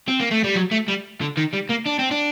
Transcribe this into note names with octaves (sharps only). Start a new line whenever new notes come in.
C4
A#3
A3
G3
F#3
A3
G3
D3
D#3
G3
A#3
D4
C4
D4